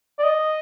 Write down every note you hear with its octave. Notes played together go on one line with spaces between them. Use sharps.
D5
D#5